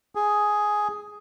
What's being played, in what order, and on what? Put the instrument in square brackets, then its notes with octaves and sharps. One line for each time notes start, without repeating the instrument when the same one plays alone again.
[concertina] G#4